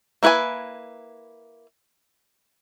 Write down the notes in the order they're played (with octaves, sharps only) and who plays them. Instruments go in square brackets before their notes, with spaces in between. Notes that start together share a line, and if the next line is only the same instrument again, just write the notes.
[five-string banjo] A#3 E4 B4 C#5 G#5